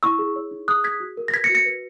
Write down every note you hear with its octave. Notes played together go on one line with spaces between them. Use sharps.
E4 C#6 E6
G#4
C#5
D#4
G#4 D#6 F#6
G#4 G#6 B6
F#4
A#4
A#6
B4 G#6 B6
A#6 C#7
F#4
A#6 C#7
B4